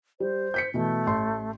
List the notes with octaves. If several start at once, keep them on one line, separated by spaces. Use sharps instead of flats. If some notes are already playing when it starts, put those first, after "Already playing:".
G3 C5
G6 B6 C#7
B2 E3 A3
A1 C6